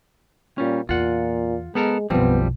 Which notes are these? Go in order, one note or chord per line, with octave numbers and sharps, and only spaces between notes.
A#2 G3 C#4
E2 A#2 F4 F#5
G#3 B3 A4 A#4
F#1 B1 F3 G3 B3 C4